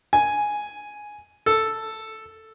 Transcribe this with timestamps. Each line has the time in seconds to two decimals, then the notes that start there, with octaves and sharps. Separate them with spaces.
0.13 G#5
1.46 A4